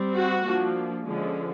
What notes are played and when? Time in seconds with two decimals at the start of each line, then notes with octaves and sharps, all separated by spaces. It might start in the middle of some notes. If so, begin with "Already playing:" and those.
Already playing: G3 C4
0.14 F#4
0.44 F3 A#3 D4
1.04 D3 F3 G#3 C#4